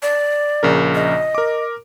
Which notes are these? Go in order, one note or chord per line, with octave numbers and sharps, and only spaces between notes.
D5
A#1 C#3 A#4
D#5
A#4 D6